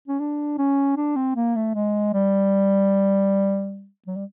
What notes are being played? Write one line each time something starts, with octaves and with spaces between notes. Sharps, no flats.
C#4
D4
C#4
D4
C4
A#3
A3
G#3
G3
F#3
G3